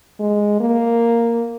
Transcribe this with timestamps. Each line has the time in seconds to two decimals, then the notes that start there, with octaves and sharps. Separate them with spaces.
0.20 G#3
0.60 A#3